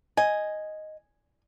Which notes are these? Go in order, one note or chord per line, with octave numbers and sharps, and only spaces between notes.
D#5 G#5